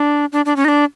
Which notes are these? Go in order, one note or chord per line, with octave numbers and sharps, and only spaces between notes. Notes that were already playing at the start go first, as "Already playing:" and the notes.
Already playing: D4
D4
D4
C#4
D#4
D4